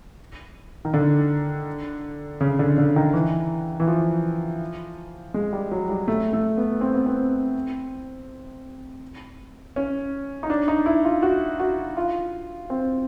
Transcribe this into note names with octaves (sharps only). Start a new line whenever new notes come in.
D#3
D3
C#3
D3
D3
D#3
E3
E3
F3
G#3
G3
F#3
G3
A3
A3
B3
C4
B3
C4
C#4
D#4
D4
D#4
E4
F4
F#4
F#4
F4
C4